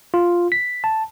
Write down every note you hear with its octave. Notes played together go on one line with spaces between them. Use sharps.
F4
B6
A5